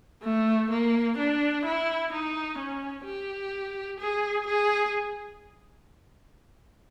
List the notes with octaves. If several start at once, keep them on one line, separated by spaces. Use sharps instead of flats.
A3
A#3
D4
E4
D#4
C#4
G4
G#4
G#4